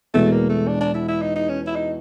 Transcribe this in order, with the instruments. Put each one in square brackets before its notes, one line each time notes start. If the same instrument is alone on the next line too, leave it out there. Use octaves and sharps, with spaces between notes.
[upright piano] E2 B2 G#3 [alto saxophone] A3
[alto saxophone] A#3
A3
D4
D4
E4
E4
D#4
D#4
C#4
E4
D#4